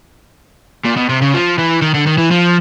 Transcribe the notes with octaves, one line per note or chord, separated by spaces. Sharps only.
A#2
B2
C3
C#3
F3
E3
D#3
D3
D#3
E3
F3